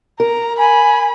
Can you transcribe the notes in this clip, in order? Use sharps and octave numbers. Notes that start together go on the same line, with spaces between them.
A#4 A#5
G#5 B5